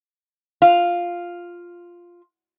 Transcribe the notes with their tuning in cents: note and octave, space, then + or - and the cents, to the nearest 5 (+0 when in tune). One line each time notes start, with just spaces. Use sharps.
F4 +0 F5 +0